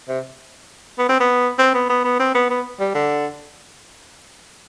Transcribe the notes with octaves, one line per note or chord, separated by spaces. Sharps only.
C3
B3
C4
B3
C4
B3
B3
B3
C4
B3
B3
G3
D3